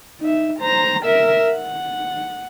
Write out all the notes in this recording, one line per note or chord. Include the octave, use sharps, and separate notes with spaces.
D#4 E5
C5 A#5
A#4 E5
F#5